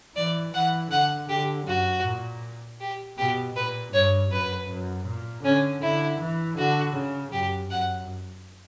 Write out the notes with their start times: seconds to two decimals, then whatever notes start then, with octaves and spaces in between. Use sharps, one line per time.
0.16 E3 D5
0.54 E3 F#5
0.91 D3 F#5
1.29 D3 G4
1.67 F#2 F#4
2.05 A#2
2.80 G4
3.18 B2 G4
3.56 A#2 B4
3.94 G2 C#5
4.31 F#2 B4
4.69 F#2
5.07 A#2
5.44 D3 C#4
5.82 D3 E4
6.20 E3
6.58 D3 F#4
6.96 C#3
7.33 F#2 G4
7.71 F#2 F#5